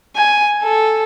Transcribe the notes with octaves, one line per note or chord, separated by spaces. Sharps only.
G#5
A4